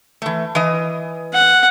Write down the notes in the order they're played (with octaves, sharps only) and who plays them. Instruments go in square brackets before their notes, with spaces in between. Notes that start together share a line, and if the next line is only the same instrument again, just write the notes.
[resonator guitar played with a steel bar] E3 A3
E3 D#5
[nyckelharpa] F#5